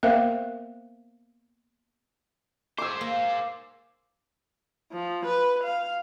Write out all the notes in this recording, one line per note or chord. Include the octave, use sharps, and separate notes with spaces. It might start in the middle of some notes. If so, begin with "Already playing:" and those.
A#3 B3 A#4 C5 E5 F5
G#4 C5 D6 E6
A#3
F3
B4
F5